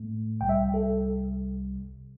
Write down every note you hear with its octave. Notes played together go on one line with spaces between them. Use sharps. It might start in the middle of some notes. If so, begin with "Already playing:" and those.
Already playing: A2 A3
C2 C3 G3 G5
E5
A4